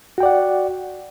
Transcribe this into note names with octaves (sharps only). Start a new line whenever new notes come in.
F#4 D5 F#5 G5